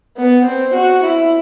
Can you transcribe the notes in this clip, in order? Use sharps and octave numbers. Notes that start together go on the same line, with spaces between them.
B3
C4
F#4
E4